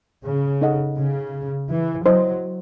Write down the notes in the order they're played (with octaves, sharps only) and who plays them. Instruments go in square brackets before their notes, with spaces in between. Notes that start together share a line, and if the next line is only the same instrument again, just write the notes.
[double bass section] C#3
[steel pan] D#4 A4 D#5 F#5
[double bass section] C#3
E3
[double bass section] F#3 [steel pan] E4 C5 D#5